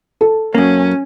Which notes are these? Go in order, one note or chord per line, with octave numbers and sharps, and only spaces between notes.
A4
F#2 A#3 C#4